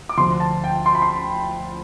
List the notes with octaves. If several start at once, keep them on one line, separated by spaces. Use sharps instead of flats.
D6
D2 D3 F3 C6
A5
G5
C6
B5
C6